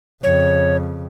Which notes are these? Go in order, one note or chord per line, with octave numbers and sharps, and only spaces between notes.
F2 C#3 C#5